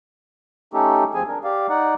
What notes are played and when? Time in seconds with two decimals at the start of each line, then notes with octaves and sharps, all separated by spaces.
0.73 A3 C#4 D#4 G4 A4
1.14 D#2 F3 C4 G#4 G#5
1.28 D4 A#4
1.44 G4 D5 F5
1.69 D#4 D5 F#5